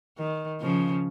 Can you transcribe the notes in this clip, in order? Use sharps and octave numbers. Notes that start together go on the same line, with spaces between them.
D#3
C#3 F3